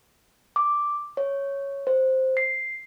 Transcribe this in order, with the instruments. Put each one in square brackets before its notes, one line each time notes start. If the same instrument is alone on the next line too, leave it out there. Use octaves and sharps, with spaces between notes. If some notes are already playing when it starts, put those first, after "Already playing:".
[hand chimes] D6
C#5
C5
C7